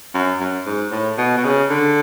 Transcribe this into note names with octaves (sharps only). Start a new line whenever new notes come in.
F#2
F#2
G#2
A2
B2
B2
C#3
D3